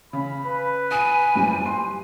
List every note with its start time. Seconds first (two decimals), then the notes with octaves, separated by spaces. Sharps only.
0.13 C#3 B5
0.45 B4
0.91 G#5 D#6 D#7
1.36 F#1 G3 G4
1.66 C6